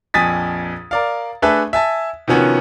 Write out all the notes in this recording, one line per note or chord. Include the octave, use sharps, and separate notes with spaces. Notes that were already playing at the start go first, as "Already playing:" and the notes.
A#1 F2 G#5 D#6 A6 B6
A#4 D5 F5
A3 D4 G#4 A4 B4 E5
E5 G#5 A5
C3 D#3 F3 B3 C#4 F#4